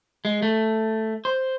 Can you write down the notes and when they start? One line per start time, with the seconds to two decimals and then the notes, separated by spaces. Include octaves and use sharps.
0.25 G#3
0.42 A3
1.25 C5